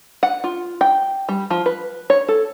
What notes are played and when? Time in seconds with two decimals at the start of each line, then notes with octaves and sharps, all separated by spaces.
0.23 F#5
0.44 F4
0.81 G5
1.29 G3
1.50 F3
1.66 B4
2.10 C#5
2.28 A4